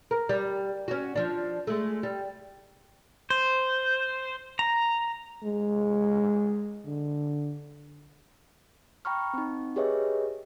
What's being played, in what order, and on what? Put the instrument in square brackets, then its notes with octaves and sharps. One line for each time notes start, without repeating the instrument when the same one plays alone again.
[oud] A#4
G3
C#4 F#4
F3 D4
G#3 A3
G3
[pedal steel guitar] C5
A#5
[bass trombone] G#3
D3
[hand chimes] G5 A#5 B5 C#6 F6
C4 D#4
G4 G#4 B4 C#5 D#5 E5